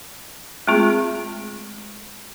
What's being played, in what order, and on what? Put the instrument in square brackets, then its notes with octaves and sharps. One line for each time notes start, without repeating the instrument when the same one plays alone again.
[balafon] G#3 A3 C4 F4 G#4